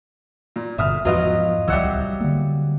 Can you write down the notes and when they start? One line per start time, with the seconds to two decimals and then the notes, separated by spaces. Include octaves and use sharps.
0.56 A#2
0.78 G1 B2 D3 E5 D#6 F6
1.05 E2 G#2 F3 F#3 F4 B4 D#5 F5
1.68 D1 C2 F#3 G3 E5 F#5 E6
2.20 D3 A#3